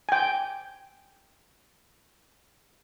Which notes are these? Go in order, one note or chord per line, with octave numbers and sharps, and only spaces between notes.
G5 G#5